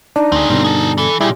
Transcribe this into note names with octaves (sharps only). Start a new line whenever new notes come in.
D4 D#4
D2 C4 G#4
G2 B2 D3 C4 C#4
G#4 A4
E3 A4
A#2 G3 E4 G4 G#4